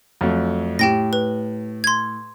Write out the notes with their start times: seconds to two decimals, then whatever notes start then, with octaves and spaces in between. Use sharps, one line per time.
0.21 F2 F#3 A3
0.79 A2 G4 G5 A#6
1.13 B4
1.84 C6 G#6